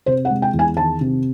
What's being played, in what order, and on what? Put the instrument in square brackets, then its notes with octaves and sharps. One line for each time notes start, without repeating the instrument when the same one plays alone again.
[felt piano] C3 C5
F#5
G#3
G5
E2
G#5
D#3 A5
C3